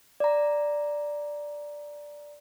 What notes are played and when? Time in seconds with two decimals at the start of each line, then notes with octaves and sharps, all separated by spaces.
0.20 D5 A#5